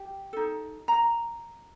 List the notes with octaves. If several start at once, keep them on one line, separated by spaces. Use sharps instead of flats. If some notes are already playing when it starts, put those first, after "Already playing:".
Already playing: G4 G5
D#4 A4
A#5